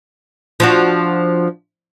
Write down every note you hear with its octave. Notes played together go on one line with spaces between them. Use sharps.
F3 D4 F#4